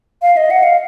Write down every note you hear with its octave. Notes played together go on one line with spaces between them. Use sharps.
F5
D#5
F#5
F5